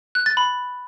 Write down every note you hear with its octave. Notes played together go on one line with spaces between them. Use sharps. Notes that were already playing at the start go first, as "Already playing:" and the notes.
F#6
A6
B5